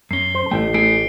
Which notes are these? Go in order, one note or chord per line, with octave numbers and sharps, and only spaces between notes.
F#2 C#4 C7 G7
C5
A1 A3 G5
A3 E4 G#4 C7 D7